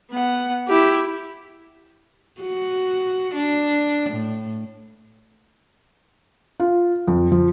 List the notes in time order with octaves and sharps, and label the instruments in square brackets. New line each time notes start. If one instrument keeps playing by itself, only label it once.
[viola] B3 F#5
E4 G4
[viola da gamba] F#4
D4
A2
[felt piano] F4
F2
F3